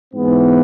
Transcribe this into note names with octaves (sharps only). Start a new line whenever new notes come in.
G#2 E3 B3